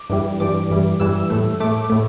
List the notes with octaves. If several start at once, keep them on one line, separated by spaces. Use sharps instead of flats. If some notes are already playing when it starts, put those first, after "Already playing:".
Already playing: D6
G2 E3 G3
G2 E3 G3 D6
G2 E3 G3
G2 E3 G3 E6
A2 A3
A2 A3 D6
A2 A3